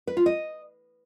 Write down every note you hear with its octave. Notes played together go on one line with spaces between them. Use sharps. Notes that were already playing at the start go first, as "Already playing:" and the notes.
B4
F4
D#5